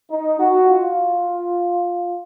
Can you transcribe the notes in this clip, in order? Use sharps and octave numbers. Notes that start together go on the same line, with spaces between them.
D#4
F#4
F4